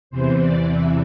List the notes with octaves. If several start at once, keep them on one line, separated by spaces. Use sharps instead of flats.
E2 C3 E3 C5
D5
E5